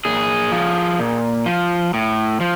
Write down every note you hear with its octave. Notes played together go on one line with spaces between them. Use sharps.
A#2 G#4
F3
A#2
F3
A2
F3